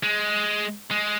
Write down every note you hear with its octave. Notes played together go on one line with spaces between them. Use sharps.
G#3
G#3